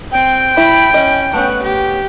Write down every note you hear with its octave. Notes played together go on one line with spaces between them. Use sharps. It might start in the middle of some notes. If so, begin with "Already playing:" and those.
C4 G5
E4 B5
C#4 D#5
A3 B3 C#4 F#5
G4